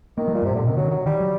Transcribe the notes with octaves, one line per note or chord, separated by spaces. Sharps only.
D#3 A#3
F#3
A#2 G3
G2
C3
A2
A#2 D3
C3 D#3
D3 F#3
D#3
F#3
D#3 G3
F#3